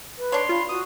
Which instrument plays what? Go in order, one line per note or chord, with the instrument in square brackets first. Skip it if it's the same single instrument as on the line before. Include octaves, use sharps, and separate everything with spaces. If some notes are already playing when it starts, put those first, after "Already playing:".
[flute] B4
[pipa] D4 C#5 [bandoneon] C6
[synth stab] F4 [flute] B5
[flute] F#4 [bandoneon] D#6